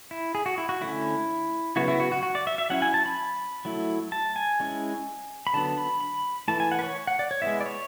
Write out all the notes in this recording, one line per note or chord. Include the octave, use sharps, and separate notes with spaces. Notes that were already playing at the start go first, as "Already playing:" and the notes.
E4
G#4
F#4
E4
F#4
D3 A3 C#4 E4
C#3 F#3 B3 E4 F#4
E4
F#4
F#4
F#4
D5
E5
E5
F#3 C#4 E4 F#5
G#5
A5
B5
F#3 A3 E4
A5
G#5
G#3 C#4 E4
B5
D3 F#3 B3 D4 A5
B5
B5
E3 A3 E4 A5
G#5
F#5
B4
C#5
F#5
D5
C#5
G#3 B3 E4 E5
D5
C#5